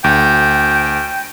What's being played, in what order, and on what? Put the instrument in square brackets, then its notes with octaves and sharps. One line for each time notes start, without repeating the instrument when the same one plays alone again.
[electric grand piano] D2 [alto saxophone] G5